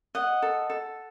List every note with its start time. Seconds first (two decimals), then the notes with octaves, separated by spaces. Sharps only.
0.15 D#5 F#5
0.42 A4
0.70 A4